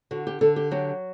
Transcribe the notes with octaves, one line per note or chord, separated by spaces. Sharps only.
D3 F#4
G4
D3 A4
G4
F#3 G4